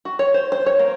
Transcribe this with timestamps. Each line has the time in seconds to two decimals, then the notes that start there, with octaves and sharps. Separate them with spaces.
0.05 F#4
0.19 C#5
0.34 C5
0.52 C5
0.66 C#5
0.79 A#3